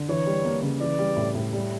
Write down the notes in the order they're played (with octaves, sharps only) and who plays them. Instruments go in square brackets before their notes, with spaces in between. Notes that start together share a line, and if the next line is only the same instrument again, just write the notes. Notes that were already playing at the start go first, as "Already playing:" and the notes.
Already playing: [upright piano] D3
[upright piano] E3 [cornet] C#5
[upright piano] G3
A#3
C#3
[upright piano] E3 [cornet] D5
[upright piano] G3
A2
A2
G3